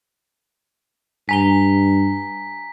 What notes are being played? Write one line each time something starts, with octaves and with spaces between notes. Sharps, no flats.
G2 G#5 A#5 B6 G7